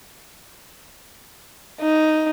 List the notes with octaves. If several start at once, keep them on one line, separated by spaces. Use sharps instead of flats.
D#4